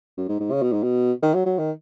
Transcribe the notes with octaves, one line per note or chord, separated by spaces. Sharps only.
F#2
G#2
G#2
C#3
B2
G#2
B2
D#3
F#3
F#3
D#3